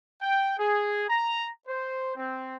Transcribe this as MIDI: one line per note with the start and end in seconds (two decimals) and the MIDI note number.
0.22 0.56 79
0.58 1.03 68
1.09 1.47 82
1.67 2.16 72
2.16 2.56 60